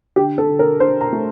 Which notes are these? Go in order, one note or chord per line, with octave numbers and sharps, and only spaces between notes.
D3 G4
A4
D3
A#4
D4 C5
A#5
A3